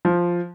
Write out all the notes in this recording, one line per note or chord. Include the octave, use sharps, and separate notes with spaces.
F3